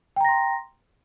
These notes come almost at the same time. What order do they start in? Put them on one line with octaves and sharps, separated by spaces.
G5 A#5 A#6 C6